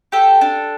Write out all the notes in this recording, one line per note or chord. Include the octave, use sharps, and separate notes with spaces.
G4 A4 G5
D4